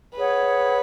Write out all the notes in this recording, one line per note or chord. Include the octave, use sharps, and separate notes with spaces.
G#4 B4 C#5 F#5